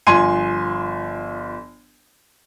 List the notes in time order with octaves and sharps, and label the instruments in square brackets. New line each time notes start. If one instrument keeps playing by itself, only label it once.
[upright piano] G1 F3 G#5 C6 G#6 D#7